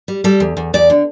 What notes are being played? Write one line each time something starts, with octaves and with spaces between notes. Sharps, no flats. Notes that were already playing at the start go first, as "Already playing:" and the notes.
G3
G3 A4
E2
E2
E2 D5
D3